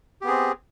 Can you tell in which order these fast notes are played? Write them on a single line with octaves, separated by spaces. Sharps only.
G4 B3 G#4 C4